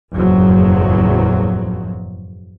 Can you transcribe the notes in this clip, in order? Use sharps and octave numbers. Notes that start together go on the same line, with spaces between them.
F#1 E2 A2 F3 F#3